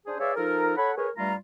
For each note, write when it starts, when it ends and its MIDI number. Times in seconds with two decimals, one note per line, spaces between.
0.06 0.16 62
0.06 0.16 68
0.06 0.16 72
0.19 0.32 68
0.19 0.32 71
0.19 0.32 73
0.19 0.32 74
0.19 0.32 76
0.19 0.32 77
0.36 0.76 53
0.36 0.76 63
0.36 0.76 69
0.36 0.76 70
0.77 0.91 69
0.77 0.91 73
0.77 0.91 78
0.77 0.91 83
0.97 1.10 68
0.97 1.10 70
0.97 1.10 71
0.97 1.10 73
1.17 1.34 43
1.17 1.34 55
1.17 1.34 57
1.17 1.34 65
1.17 1.34 82